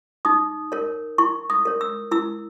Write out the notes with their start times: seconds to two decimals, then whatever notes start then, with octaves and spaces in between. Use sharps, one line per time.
0.25 D#4 D#6
0.72 A#4 C#5
1.18 E4 C#6
1.50 D#6
1.65 A#4 C#5
1.81 E6
2.11 E4 E6